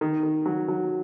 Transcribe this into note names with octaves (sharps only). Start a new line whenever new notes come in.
D#3
D#3
F#3
F#3